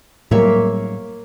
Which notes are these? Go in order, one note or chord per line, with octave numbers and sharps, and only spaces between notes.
A2 F#3 G3 A#3 C#5 E5